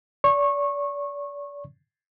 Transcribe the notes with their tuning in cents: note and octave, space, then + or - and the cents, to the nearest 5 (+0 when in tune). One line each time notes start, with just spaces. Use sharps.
D5 -35 C#6 -20